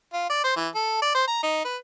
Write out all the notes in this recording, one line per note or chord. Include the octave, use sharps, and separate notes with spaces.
F4
D5
C5
E3
A4
D5
C5
A#5
D#4
B4